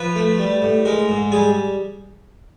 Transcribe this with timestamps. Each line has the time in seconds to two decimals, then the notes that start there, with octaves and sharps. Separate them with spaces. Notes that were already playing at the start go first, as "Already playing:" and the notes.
Already playing: F3 B4
0.16 A3
0.39 G3
0.62 A2
0.85 G#3 A#4
1.09 G#2
1.32 G3 G#4